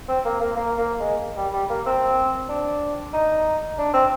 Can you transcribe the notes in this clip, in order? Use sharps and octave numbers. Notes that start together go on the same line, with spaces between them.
C4
A#3
A#3
A#3
A#3
G#3
G3
G3
A#3
C4
D4
D#4
D4
C4